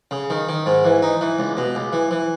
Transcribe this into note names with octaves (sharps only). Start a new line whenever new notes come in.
C#3
D#3
D#3
G#2
E3
D#4
E3
C#2
B2
C#2
E3
E3